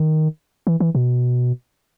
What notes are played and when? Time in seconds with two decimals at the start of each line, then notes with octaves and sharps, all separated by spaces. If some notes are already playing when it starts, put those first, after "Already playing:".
Already playing: D#3
0.67 E3
0.80 E3
0.95 B2